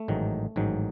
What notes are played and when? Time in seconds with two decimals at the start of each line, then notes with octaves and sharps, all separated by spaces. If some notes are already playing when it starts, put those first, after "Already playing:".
Already playing: A3
0.08 A1 G#2 D#3 F#3
0.56 A1 G#2 D#3 F#3